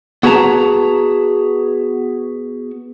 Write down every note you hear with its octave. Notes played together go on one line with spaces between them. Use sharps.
B3 F#4 G#4 B4 A5 A#5